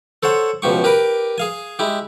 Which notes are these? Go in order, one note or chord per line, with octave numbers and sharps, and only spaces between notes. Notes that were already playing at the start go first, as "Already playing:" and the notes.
A4 C5 C#5 F#5
C#2 B2 F3 G4 C#6
G4 A#4 B4 D6
G#4 F5 G#5
G#3 E4 G4